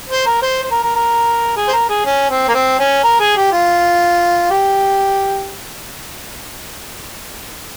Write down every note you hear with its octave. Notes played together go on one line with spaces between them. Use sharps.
C5
A#4
C5
C5
A#4
A#4
A#4
G#4
C5
A#4
G#4
C#4
C4
A#3
C4
C#4
A#4
G#4
G4
F4
G4